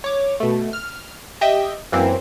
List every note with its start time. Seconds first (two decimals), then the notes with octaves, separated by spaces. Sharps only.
0.04 C#5 D6
0.40 B2 A3
0.73 F6
1.41 G4 D#5 E5 G5
1.92 F#2 E3 A#3 C4